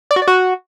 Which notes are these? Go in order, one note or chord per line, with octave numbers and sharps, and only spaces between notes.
D5
F#4
D5
F#4